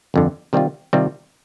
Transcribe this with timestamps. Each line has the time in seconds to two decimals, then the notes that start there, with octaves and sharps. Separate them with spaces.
0.14 G1 F2 D3
0.53 C3 D#3 G3 C4 F4
0.93 C3 D#3 G3 C4 F4